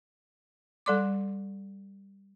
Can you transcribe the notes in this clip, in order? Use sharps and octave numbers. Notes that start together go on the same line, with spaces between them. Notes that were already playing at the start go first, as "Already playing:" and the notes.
G3 A4 D5 C6 D6